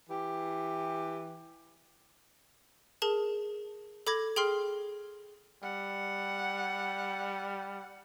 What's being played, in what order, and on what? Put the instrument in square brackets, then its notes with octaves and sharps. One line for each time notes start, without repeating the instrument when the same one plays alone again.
[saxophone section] E3 G4
[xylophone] G#4 A#4 A5
A4 B5 D6 G#6 A#6
G#4 G5 C6 F6 C7
[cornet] G3 [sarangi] F#5